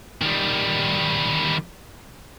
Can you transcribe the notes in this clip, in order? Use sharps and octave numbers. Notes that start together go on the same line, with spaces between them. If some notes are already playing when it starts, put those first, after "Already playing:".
D#3 G3